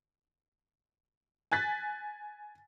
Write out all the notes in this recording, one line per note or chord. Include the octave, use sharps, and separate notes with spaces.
G#5 F#6 A6 B6